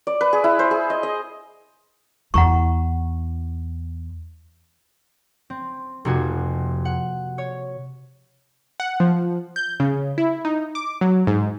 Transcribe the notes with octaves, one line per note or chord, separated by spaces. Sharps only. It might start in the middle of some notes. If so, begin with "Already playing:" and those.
D5
B4
G#4
E4
C5
G#4
D#5
D#5
E2 E4 F#5 A#5 C#6
C4
F1 F2 C3 A#3 F#4 G#5
F#5
C#5
F#5
F3
G6
C#3
E4
D#4
D6
F#3
G#2